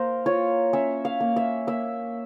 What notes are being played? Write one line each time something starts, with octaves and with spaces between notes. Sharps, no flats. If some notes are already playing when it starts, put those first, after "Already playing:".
Already playing: A#3 A#4 C5
F4 C#5
C#4 E5
F5
A#3
E5
A#3 E5